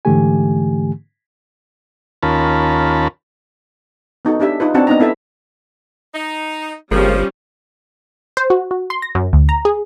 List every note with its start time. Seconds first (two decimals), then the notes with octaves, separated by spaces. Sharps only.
0.05 G#2 D3 E3 A3 G4 G#5
2.23 D#2 C#4 F4 A#4 A5 B5
4.25 B3 D#4 F#4 A4
4.40 C#4 D4 G4 E5
4.60 D#4 F4 B4
4.74 C4 D4 F#4 D5 F#5 A5
4.87 B3 D4 D#4 D#5 A#5
5.00 B3 E4 A4 E5 A5
6.14 D#4
6.91 G1 F3 G3 G#3 C#4 G4 A#4
8.37 C5
8.50 F#4
8.71 F#4
8.90 C6
9.02 A#6
9.15 F#2
9.33 D2
9.49 A#5
9.65 G#4